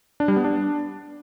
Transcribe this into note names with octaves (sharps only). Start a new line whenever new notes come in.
D4
G3
B3
D4